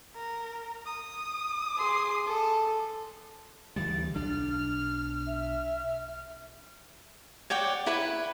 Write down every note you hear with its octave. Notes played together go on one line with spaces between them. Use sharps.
A#4
D#6
G#4 C6
A4
D2 E3 G3 A6
B1 D4 F6
E5
C#5 D5 F#5 G5
E4 B4 B5